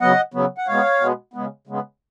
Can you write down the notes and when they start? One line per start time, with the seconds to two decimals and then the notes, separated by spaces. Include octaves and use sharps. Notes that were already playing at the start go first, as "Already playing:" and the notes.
0.01 C#3 F#3 B3 D#5 F#5
0.34 C#3 F#3 B3
0.58 F#5
0.67 B2 G#3 B3 C#5 F5
1.00 B2 G#3 B3
1.34 C#3 G#3 B3
1.67 C#3 G#3 B3